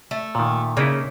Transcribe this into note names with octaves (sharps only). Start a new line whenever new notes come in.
A3
A#2 D#3
C#3 A#3 D#4 E4